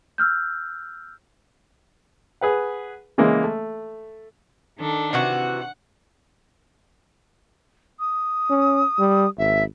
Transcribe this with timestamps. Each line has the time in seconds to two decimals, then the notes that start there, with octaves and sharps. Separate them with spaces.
0.18 E6 F6 G6
2.41 G#4 B4 F#5
3.18 C#3 E3 G#3 A#3
3.44 A3
4.78 D#3 D4 A4
5.13 C3 E3 F#4 F#5
7.99 D#6
8.50 C#4
8.99 G3
9.38 G#1 E5